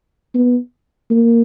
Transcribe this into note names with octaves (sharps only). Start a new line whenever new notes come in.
B3
A#3